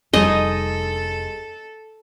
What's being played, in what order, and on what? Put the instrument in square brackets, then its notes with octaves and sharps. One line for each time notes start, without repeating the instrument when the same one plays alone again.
[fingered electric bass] F1 G3 [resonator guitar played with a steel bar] C4 D#4 G#4 [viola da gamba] A4 [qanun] D#5